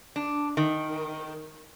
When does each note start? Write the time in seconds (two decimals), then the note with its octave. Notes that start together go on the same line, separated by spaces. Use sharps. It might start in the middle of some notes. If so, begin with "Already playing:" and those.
0.16 D4
0.57 D#3